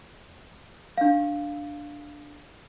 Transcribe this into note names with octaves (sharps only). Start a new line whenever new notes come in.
D4 F5